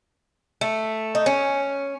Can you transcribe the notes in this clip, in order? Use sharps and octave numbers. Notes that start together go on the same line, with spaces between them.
A3
D#4
C#4